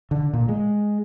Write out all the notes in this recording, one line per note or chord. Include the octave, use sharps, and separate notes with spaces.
D3
A#2
G#3